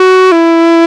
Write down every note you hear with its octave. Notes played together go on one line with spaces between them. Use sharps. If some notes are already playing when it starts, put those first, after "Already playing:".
Already playing: F#4
E4